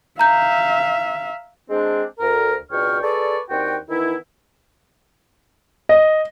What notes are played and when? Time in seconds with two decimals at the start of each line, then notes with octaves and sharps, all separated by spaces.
0.19 E5 F5 A#5 G6
1.70 G#3 C4 D4
2.20 D2 A#4
2.71 C#2 B2 D4 C#5 G5 F6
3.02 G#4 A4 B4 C#5 D5
3.50 D#2 C4 D4 F#4 G5
3.89 D#3 E3 B3 E4
5.89 D#5